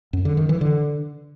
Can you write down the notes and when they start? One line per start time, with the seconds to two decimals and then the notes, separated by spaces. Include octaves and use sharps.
0.13 F#2
0.25 D3
0.37 D#3
0.49 E3
0.61 D3